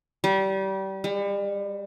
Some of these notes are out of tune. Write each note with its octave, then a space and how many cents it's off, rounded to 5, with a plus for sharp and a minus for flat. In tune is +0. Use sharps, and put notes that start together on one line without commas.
G3 -25
G3 +40